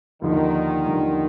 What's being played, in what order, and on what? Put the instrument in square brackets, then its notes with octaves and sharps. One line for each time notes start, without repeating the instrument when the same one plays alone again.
[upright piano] D#2 D3 F3 [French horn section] D#3
[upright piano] D#2 D3 F3